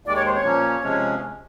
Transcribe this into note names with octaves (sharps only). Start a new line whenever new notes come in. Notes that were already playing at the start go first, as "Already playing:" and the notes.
D#2 D#3 G#3 D5
C#5
C5
C#5
A#2 F3 A#3 C#4
C3 F3 G#3 C#4